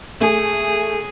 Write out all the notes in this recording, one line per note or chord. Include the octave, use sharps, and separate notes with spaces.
A3 G#4 G#5